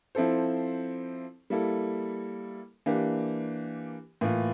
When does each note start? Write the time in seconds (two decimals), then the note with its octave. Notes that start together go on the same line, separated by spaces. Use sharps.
0.15 F3 C4 E4 A4 C5
1.50 G3 A#3 E4 A4
2.86 E3 A#3 D4 G4
4.21 A2 E3 A#3 F4